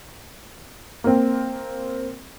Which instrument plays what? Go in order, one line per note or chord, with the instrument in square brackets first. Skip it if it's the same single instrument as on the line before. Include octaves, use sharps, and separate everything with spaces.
[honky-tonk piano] A#3 C4